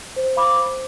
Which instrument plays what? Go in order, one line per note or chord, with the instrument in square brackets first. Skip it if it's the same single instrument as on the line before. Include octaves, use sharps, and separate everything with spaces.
[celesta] C5
F5 B5 D6
C5